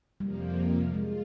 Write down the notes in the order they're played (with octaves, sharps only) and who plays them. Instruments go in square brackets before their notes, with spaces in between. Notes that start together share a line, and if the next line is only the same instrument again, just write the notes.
[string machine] F2 C3 F3 A#3 [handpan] G3
[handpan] G#3 [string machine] F4